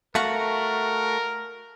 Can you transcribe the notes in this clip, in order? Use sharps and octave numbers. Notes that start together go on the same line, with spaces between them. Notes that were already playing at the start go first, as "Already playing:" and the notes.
A3 F#4 A#4 F5 F#5 C#6